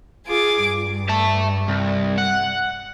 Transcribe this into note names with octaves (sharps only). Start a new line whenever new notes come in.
F4 G#4 D6
G2
E5 A5
C2
F#5